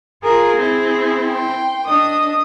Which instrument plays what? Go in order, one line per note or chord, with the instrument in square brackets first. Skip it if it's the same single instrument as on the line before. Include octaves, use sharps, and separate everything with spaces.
[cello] F4 A#4 [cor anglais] G#4
[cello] C4 E4
[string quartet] G5 C6
[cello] D4 [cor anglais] D#5 [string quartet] D#6